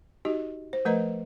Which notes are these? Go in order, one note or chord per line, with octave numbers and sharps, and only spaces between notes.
D#4 F#4 G4 D#5
C5
F3 A3 A#4 B4 D#5 A#5